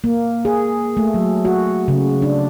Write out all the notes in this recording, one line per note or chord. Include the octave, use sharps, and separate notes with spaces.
A#3
G#4
A3
F#3
F#4
C#3
D4